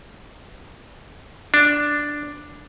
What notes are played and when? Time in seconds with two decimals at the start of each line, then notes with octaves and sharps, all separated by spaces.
1.54 D4